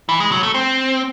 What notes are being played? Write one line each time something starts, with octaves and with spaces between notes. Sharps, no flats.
E3
G#3
F#3
A3
C4